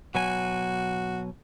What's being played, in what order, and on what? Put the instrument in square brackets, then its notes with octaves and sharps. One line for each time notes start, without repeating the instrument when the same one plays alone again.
[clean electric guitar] B2 F#3 G#5 [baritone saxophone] F#4